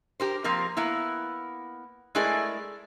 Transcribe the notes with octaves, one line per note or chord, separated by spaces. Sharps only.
G4 A#4 C5
F3 A#3 C4 A#4
A#3 B3 E4
G#3 A3 E4 G#4 A#4 D5